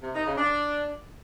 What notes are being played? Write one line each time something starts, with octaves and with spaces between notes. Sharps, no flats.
C3
D#4
C#3
D4